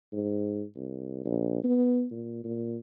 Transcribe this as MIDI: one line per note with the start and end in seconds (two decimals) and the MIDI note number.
0.13 0.64 44
0.76 1.22 36
1.25 1.59 34
1.64 2.06 59
2.11 2.43 46
2.44 2.77 46